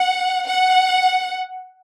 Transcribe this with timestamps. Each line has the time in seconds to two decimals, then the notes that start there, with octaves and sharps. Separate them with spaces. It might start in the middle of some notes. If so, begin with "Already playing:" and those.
Already playing: F#5
0.45 F#5